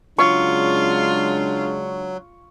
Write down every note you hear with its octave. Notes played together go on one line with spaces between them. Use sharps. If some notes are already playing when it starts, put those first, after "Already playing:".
C#3 F#3 G#3 D4 F4 C#6